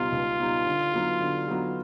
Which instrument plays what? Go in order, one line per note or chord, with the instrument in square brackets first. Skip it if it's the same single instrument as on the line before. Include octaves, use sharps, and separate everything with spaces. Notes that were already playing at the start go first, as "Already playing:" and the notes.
Already playing: [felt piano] C#2 B2 G3 B3 D#4 [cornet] F4
[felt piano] C#2
B2 G3 B3 D#4
D3
F#3 B3 D#4 F#4
D3
F#3 B3 D#4 F#4